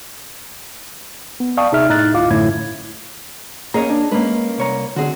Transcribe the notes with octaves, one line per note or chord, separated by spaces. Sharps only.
B3
D5 F5 G5 A5 C#6 D#6
C3 D#4 G#4 E5 F6
A2 D#4 F6 F#6 A6
G1 D2 E4 F4 F5 D6
A1 F#2 A2 D3 E4 G#6
A#3 C#4 G#4 C#5 D#5 A#5
D4
G#3 A#3 C#4 B4
C2 C#5 A#5
D3 C4 F#4 G#4